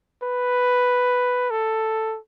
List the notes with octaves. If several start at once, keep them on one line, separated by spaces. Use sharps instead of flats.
B4
A4